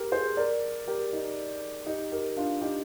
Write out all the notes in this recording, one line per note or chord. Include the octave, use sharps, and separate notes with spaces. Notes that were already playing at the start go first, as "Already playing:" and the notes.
Already playing: G4 A#4
G#4 C5
A#4 D5
G4 A#4
D#4
D#4 G4
G4 A#4
D4 F4
D#4 G4